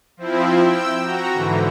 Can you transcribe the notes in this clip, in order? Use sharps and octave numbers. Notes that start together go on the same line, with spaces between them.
F3 C4 E4
G5 E6
F#4 A#5
G#2 D3 E3